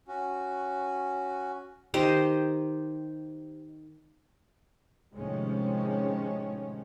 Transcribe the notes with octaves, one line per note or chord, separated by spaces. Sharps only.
C#4 F#4
D#3 G4 C5 D#5
A2 C3 D#3 F3 G#3 C#4